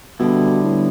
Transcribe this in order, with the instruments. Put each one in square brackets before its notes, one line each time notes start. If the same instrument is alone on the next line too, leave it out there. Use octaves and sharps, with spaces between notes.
[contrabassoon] B2 [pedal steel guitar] D3 G3 B3 E4
[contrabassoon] A2